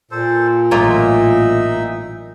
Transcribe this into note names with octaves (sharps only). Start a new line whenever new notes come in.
A#2 A4 C5
A1 F#3 A#3 D#4 F4 E5